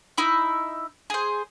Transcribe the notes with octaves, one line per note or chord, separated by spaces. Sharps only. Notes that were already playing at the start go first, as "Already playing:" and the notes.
D#4 E4 E5
G#4 C5